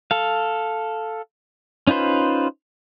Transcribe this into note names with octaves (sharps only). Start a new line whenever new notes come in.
A4 F5
C#4 D#4 F4 B4 C5